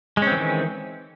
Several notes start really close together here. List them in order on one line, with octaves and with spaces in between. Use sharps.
G#3 C#4 C4 E3 D#3